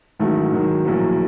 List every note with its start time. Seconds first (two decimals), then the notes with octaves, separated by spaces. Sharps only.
0.20 A1 G#2 D#3 F#3 A3
0.52 G#2 D#3 F#3
0.84 A#1 A2 F#3 A#3